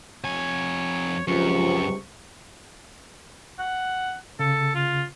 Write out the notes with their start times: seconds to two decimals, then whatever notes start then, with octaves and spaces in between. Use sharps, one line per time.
0.24 F2 C#5 G#5
1.28 C#2 F#2 C3 F3 C#6
3.59 F#5
4.39 C#3 A4
4.75 F4